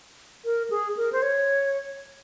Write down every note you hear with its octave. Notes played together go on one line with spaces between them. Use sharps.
A#4
G#4
A#4
C5
C#5